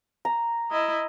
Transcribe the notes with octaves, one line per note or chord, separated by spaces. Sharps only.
A#5
E4 D#5